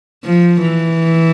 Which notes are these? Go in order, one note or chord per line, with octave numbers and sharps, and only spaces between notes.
F3
E3